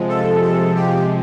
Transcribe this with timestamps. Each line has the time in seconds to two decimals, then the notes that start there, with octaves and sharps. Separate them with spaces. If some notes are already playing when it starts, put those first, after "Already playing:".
Already playing: C3 F3 G#3
0.09 A4
0.42 A4
0.75 G4